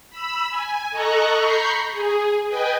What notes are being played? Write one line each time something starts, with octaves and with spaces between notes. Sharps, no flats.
B5 E6
G#5
A4 D#5 A#5 C#6 F#6
A#5 B5 C#6 G6 C7
G#4
B4 D#5 G5 G#5